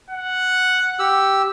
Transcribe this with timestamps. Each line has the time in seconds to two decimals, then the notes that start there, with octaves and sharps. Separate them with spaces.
0.11 F#5
0.99 G4 E6